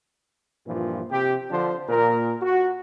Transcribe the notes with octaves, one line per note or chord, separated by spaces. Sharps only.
G2 A#2 E3 F3
C3 G4
D3 F3 D4 C5
A#2 A#4
F#4